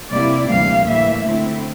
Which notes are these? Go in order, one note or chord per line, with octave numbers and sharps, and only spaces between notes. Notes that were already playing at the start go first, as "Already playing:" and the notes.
C3 G3 A#3 E4 D5
D2 C3 E3 G3 A#3 F5
A2 E3 G3 A#3 E5
D3 A3 C4 E4